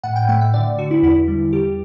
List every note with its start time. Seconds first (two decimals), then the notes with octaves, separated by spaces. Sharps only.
0.04 A2 F#5
0.16 G5
0.29 A3 F#5
0.41 E5
0.54 D3 D5
0.78 D3 F#4
0.91 E4
1.03 E2 E4
1.28 G3
1.53 G3 G4